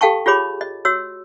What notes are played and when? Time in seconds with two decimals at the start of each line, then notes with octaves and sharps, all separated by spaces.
0.01 G4 A4 F5 G5 A5 C#6
0.26 F4 G4 G#4 C#5 B5 D6
0.61 D#5
0.85 F#4 C#5 E6